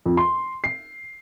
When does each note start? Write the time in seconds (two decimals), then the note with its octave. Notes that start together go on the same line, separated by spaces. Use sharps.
0.06 F2
0.17 C6
0.64 C7